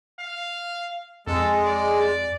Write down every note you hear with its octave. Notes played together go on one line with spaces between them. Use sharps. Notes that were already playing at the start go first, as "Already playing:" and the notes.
F5
F2 G#3 A4
D5